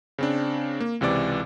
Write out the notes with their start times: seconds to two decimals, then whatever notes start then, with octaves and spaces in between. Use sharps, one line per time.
0.18 C#3 C4 D4
0.80 A#3
1.01 C#2 C3 E3 D5 D6